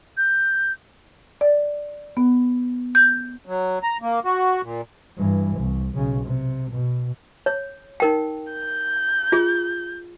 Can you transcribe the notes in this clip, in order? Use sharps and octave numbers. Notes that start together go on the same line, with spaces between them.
G6
D5
B3
G6
F#3
A#5
A#3
F#4
A#2
G2 E3
C2
B1 C#3
C3
B2
C#5
D#4 A#4 G5
G6
F4 G#4